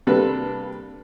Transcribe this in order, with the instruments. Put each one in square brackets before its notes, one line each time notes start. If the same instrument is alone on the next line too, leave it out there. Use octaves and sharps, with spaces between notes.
[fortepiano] C3 G3 A#3 D4 A4 B4